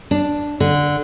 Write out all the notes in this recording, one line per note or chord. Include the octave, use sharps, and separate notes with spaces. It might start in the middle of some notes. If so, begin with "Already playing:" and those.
D4
D3